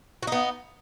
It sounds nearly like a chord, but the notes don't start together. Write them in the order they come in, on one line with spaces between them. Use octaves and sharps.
F#4 D#4 B3